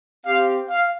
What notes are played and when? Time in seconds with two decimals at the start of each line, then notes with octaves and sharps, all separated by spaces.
0.24 C4 G4 F5
0.69 F5